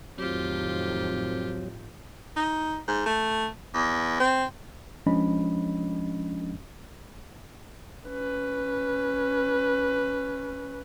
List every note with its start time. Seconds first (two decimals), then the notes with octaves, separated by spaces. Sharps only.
0.18 F2 A2 D#3 F#3 C4 F4 G4
2.36 D#4
2.88 G#2
3.06 A3
3.74 E2
4.20 C4
5.06 F3 G#3 C#4 D4 D#5 B5
8.10 C#4 B4